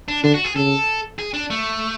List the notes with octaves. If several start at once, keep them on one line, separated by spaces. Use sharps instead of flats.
D4
D3 D4
F#4
G#4
C#3 A4
G#4
D4
A3